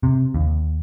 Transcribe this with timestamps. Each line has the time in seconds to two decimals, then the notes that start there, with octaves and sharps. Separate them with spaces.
0.03 C3
0.34 D#2